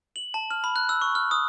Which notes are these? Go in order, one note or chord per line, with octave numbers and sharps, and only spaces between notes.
F#7
A5
F6
B5
F#6
E6
C#6
F6
D#6